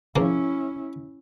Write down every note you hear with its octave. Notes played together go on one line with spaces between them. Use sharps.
C#3 F3 A#3 C#4 E4